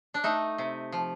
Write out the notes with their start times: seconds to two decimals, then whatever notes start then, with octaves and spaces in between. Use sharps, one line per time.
0.14 D4
0.24 A3 D#4
0.58 C3
0.92 F3